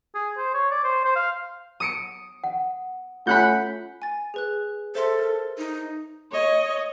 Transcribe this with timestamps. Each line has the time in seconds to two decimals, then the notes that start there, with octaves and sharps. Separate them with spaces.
0.15 G#4
0.38 C5
0.54 C#5
0.71 D5
0.84 C5
1.05 C5
1.16 F5
1.80 D#6 C#7 D7
2.44 F#5
3.27 A3 C#4 F4 F#5 B5 F#6 G6
4.02 G#5 A6
4.34 G#4 B4 F#6
4.95 A4 C5 E5 C6
5.19 A#4
5.58 D#4
6.32 C#5 D#5